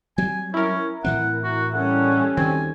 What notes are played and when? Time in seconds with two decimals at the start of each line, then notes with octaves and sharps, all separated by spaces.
0.18 F#3 G3 C4 G#5
0.54 C#4 E4 A#4
1.05 A2 E3 C4 F#5
1.44 F#4
1.74 G3 C#4 A4 F#5
2.37 D2 D#3 C4 G#5